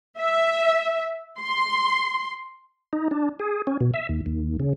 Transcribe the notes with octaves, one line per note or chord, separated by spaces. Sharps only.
E5
C6
D#4
D4
G#4
C#4
B2
E5
D#2
D#2
C#3